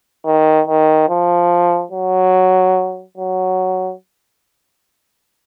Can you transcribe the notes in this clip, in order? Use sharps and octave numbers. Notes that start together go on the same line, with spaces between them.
D#3
D#3
F3
F#3
F#3